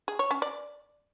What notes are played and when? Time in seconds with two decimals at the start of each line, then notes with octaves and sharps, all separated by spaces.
0.08 G#4
0.19 C#5
0.31 C#4
0.42 D5